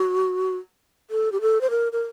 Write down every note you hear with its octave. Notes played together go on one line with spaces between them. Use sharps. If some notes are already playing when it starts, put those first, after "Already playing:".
Already playing: F#4
A4
G4
A4
C5
A#4
A#4